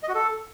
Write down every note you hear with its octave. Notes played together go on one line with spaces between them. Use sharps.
D#5
F#4
A4